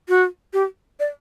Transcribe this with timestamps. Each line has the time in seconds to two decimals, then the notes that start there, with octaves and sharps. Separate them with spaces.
0.09 F#4
0.53 G4
1.00 D5